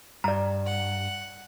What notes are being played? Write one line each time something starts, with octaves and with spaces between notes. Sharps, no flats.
G2 D5 A#5
F#5